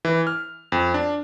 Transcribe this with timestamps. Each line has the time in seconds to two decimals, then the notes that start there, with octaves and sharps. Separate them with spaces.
0.05 E3
0.27 F6
0.72 F2
0.94 D4